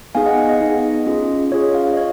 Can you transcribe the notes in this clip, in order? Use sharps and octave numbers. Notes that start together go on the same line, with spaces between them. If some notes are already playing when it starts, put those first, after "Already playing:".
B3 D#4 G#4 F5 G#5
D#5 F#5
D#5
D#5
B3 D#4 G#4
C#4 F4 G#4
C#4 F4 G#4 C#5
C#5 F5
D#5
C#5